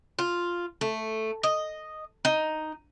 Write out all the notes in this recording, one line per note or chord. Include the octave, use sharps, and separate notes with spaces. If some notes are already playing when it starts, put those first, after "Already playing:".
F4
A3
D#5
D#4